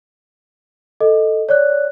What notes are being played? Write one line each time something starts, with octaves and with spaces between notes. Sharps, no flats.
A4 D#5
C#5 D5 F#6